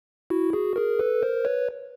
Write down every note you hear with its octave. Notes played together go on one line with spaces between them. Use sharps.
E4 F#4
F#4 G#4
G#4 A#4
A4 B4
A#4 C5
B4 C#5